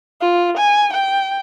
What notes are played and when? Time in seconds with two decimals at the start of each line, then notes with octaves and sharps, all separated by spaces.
0.21 F4
0.57 G#5
0.93 G5